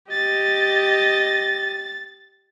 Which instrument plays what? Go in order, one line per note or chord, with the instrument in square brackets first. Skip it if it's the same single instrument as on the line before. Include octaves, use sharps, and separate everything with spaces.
[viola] G4 D#5 [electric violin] A6